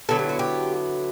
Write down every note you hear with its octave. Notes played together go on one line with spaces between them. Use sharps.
D3 F#3 B3 E4 A4
G4
F#4
G4